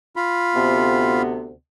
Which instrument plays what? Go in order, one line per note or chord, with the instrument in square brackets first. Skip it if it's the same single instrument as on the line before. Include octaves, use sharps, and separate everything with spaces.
[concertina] F4 B5
[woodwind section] D2 C3 B3